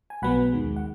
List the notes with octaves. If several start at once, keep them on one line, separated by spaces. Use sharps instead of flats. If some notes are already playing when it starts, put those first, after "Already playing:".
G#5
B1 B2 F#3 B3 F#5 B5
D#2 D#3 G#3
F#5